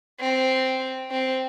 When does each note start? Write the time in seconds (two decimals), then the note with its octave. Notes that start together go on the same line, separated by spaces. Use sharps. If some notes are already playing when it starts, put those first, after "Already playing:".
0.20 C4
1.11 C4